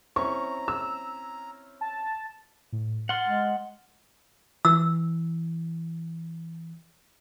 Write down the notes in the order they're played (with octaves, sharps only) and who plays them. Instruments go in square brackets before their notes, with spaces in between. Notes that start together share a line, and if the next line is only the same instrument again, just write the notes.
[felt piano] C4 C#4 E4 [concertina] A#5 [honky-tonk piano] C#6
[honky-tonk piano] E6
[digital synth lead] A5
[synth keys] A2
[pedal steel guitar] F#5 C6 [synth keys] F6 A6
[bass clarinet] G#3
[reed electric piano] E3 [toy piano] E6